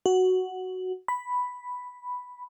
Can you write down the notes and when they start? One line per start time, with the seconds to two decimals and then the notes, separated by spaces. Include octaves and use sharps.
0.06 F#4
1.08 B5